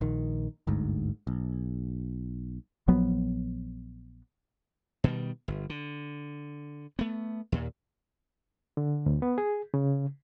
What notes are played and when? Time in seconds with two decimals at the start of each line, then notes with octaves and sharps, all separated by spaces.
0.01 A#1 D#3
0.67 G1 D2 G#2
1.27 B1
2.88 A#1 F3 F#3 B3
5.04 B2 D#3 G3
5.48 G1
5.70 D3
6.99 A3 B3
7.52 D#2 A#2
8.77 D3
9.06 D2
9.22 B3
9.38 G#4
9.74 C#3